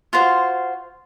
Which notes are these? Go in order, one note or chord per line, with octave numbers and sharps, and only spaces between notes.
F4 F#4 C5 F5